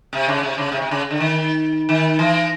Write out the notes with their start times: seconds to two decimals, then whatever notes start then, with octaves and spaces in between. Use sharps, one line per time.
0.13 C3
0.28 C#3
0.43 C3
0.58 C#3
0.72 C3
0.82 C3
0.91 C#3
1.11 D3
1.20 D#3
1.89 D#3
2.19 E3